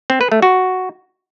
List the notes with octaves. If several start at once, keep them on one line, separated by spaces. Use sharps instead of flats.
C4
B4
A3
F#4